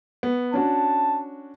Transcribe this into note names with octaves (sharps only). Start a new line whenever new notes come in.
B3
C#4 D4 F#4 A5